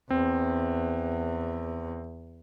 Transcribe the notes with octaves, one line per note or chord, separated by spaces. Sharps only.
E2 C4